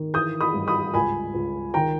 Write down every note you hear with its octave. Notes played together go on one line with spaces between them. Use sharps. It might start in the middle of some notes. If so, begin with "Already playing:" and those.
Already playing: D#3
E3 D#6 G6
B5 D#6
G2
B5 D#6
C#2 G#5 B5
C#2
D#3 G5 A#5